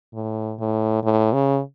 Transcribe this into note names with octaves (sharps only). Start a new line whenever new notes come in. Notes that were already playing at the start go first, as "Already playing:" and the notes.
A2
A2
A2
C#3